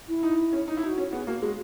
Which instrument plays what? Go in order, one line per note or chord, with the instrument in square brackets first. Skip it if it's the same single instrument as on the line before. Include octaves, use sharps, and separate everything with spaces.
[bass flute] E4
[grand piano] D#4
C#4
D#4
E4
[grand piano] D#4 [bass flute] F#4
[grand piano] C#4
[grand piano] B3 [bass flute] G#4
[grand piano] A#3 [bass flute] F#4
[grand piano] G#3 [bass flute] F#4